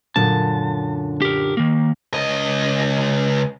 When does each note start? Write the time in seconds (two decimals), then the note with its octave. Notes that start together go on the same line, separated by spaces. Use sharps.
0.16 F#2 A#2 D3 A5
1.22 G4 A#4
1.57 D#3 A#3
2.14 C#2 D#5